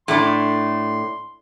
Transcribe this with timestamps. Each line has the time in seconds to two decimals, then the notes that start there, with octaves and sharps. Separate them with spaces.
0.08 A2 A3 D4 C6